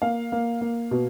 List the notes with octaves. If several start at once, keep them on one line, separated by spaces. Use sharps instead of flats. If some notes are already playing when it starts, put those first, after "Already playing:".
A#3 F5
A#3
A#3
B2